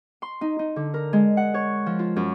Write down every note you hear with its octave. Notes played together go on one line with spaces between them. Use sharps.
C6
D#4
D#4
D3
A#4
G#3
F#5
C#5
F3
F4
F#2